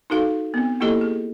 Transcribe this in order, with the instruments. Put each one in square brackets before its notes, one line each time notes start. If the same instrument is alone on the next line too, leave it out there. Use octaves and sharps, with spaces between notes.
[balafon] D#4 F#4 A4 F5
B3 C4
A#3 E4 F4 G4 A4 D#5
G#4